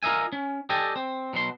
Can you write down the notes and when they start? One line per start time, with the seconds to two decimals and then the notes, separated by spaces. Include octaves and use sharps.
0.03 F4 A#4 D#5 E5 G#5
0.32 C#4
0.69 G4 A4 D5 D#5 G5 G#5
0.96 C4
1.33 B2 F#3 C6